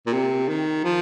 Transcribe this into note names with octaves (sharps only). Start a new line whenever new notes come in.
A#2
C3
D#3
F3